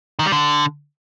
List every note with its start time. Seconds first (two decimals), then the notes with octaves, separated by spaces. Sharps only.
0.19 D#3
0.26 G3
0.32 D3